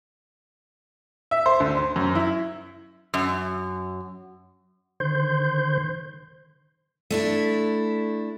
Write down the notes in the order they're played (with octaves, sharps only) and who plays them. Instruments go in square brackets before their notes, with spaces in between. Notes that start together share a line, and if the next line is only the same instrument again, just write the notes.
[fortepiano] E5
C5
D2
C5
F#2
E4
[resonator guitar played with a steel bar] F#2
[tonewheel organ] D3 D#3 C5 C6 G6
[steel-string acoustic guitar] A3 D4 E4